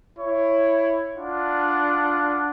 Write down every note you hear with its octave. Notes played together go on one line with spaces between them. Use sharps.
E4 C#5
D4 F4 F#5